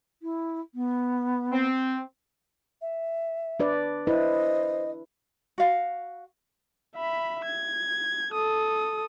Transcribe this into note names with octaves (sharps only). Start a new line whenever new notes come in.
E4
B3
C4
E5
D4 B4 D5
E4 B4 C5 D#5
F#4 F5
E5 B5
G#6
A4 D#6